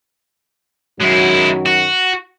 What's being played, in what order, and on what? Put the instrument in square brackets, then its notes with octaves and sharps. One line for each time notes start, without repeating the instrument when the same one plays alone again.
[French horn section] F#2 D#3 F#3 [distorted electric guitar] G#3 E4
[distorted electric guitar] F#4